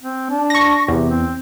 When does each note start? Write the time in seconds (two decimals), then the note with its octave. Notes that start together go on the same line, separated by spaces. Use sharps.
0.01 C4
0.30 D4
0.50 C#6 A#6
0.88 E2 C3
1.10 C4